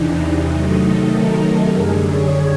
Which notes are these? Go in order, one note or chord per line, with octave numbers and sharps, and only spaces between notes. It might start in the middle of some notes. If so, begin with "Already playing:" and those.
Already playing: E2 C3 E3 D4 D#4
D4
C3 D#3 F#3 A3 D#4
A4
A#4
A4
F#2 D3 G3 G#4
C#5